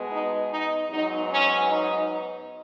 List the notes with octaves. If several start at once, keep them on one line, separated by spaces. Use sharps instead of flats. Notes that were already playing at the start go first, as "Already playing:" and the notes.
Already playing: B2 G#3 B3
D#4
D#4
G#2 F#3 B3 D#4
C#4
D#4